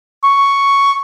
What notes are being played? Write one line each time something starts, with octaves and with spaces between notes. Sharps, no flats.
C#6